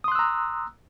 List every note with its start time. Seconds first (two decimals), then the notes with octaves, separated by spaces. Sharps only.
0.04 D#6
0.08 C6
0.12 F#6
0.15 E6
0.19 A#5